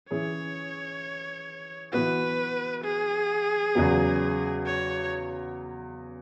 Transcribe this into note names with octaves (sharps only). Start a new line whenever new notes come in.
E3 C#4 G#4 C#5
E3 B3 F#4 B4
G#4
E2 C#3 F#3 B3
C#5